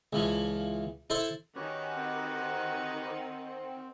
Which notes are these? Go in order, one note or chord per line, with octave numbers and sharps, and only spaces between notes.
C#2 E3 F3
E4 A4 C5 E5
D#3 C#4 D#4 F#4 G4 B4 F#5
C4